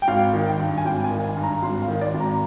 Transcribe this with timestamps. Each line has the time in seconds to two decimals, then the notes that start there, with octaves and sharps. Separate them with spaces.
0.02 G5
0.08 G#1 F5
0.33 D#3
0.46 G5
0.59 G2
0.78 G#5
0.85 G#1 G5
1.04 G#5
1.11 D#3
1.24 G#5
1.37 G2
1.43 A#5
1.63 G#1 C6
1.82 F5
1.88 D#3
2.01 D5
2.14 G#1
2.20 A#5